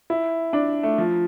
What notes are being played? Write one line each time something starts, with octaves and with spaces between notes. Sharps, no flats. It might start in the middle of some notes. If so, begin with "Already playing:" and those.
E4
D4
A3
F3